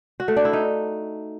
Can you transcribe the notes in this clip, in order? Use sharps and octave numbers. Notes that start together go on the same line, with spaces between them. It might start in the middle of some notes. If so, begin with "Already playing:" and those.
F#4
A3
D4
E4
D#4